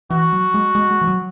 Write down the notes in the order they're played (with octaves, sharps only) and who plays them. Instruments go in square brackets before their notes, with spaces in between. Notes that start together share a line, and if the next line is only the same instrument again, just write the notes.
[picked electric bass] E3 [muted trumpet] F#4
[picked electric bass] F#3
G#3
G#3
G#3
E3
F#3